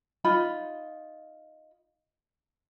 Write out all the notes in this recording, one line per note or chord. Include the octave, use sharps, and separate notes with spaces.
D#4 F4 B5